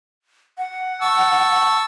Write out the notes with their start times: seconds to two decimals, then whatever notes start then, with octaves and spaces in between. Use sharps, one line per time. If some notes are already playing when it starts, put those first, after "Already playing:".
0.58 F#5
1.02 A5 C#6 E6